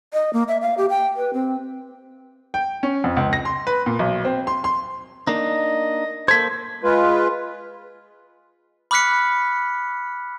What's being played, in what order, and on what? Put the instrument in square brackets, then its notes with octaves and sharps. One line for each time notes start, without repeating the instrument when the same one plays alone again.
[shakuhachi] D#5
A#3
E5
F5
G4
G5
B4
C4
[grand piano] G5
C#4
F2
C#2
A#6
C6
B4
A#2
B1
C4
C6
C6
[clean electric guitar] A#3 D4 D#4 [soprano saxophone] D#5
[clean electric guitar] A#3 A4 C5 [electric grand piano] G#6 B6
[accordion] G#3 F4 B4
[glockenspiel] B5 D6 F6 F#6 B6 C#7